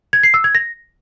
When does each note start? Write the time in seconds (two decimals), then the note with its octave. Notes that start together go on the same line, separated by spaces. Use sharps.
0.13 G#6
0.23 C7
0.34 E6
0.44 G#6
0.55 A#6